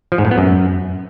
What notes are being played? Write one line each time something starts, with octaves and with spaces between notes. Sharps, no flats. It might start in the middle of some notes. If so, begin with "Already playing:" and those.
F3
G#2
A2
B3
F#2